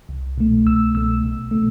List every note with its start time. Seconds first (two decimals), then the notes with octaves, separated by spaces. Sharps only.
0.09 C2
0.38 B2 A3
0.66 C2 E6
0.94 B2 A3 E6
1.23 B1
1.51 B2 A3